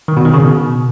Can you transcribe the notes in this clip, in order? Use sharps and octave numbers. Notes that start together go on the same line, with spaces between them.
D#3
B2
D#3
C#3
B2